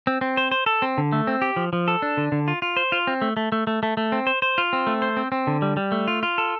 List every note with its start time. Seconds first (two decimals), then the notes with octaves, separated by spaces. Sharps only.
0.07 C4
0.21 C4
0.37 C5
0.52 C5
0.66 A4
0.82 C4
0.98 D3
1.13 A3
1.27 C4
1.42 G4
1.56 F3
1.73 F3
1.88 A4
2.02 D4
2.17 D3
2.32 D3
2.48 F4
2.62 F4
2.77 C5
2.92 F4
3.07 C4
3.22 A3
3.37 A3
3.52 A3
3.67 A3
3.83 A3
3.97 A3
4.12 C4
4.27 C5
4.42 C5
4.58 F4
4.73 C4
4.87 A3
5.02 C5
5.17 C4
5.32 C4
5.47 D3
5.62 G3
5.77 G3
5.92 A3
6.08 F4
6.23 F4
6.38 A4